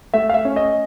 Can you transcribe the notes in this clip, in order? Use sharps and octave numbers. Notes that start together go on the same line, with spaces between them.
A3 E5
F5
E5
C#4
D#5